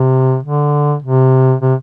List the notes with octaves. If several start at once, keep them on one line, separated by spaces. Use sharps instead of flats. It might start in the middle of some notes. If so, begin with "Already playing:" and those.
Already playing: C3
D3
C3
C3